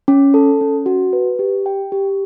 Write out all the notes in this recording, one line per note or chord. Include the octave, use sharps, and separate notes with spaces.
C#4
A4
C#4
F#4
B4
G4
G5
G4